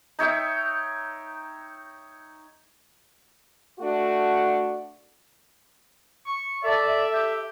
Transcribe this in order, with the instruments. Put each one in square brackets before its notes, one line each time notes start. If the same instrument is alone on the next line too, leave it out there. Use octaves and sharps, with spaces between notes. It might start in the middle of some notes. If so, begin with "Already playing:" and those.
[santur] D#4 C#5 E5 G5
[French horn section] A3 D4 F#4
[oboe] C#6
[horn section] A4 E5 [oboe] D5
[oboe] G4